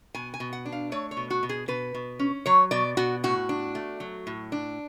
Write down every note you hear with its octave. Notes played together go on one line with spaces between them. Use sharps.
B2 G#5
G#5
B2
F#5
D4
F5
A3 C#5
C#5
B2
F#4
B2
G#4
B2 B4
B2
C#4
F#3 C#5
B2 D5
B2 F#4
A2 F#4
D4
A3
F#3
A2
D4